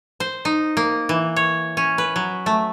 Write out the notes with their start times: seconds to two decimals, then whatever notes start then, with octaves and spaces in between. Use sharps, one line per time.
0.20 C5
0.45 D#4
0.77 A#3
1.09 E3
1.36 C#5
1.77 C#4
1.98 B4
2.16 F#3
2.46 A3